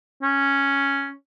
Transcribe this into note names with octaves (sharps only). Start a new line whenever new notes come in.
C#4